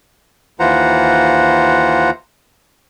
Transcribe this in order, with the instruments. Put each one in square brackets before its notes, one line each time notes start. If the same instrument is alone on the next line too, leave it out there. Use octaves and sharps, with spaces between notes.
[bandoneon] D#2 E3 F4 C5 F#5 A#5